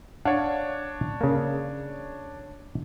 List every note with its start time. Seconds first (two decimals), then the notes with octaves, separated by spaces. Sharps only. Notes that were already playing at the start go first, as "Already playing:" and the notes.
0.25 D4 C#5 F5 F#5 A5
1.21 C#3 A#3